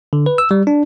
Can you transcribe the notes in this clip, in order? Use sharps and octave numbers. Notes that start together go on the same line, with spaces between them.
D3
B4
E6
G3
D4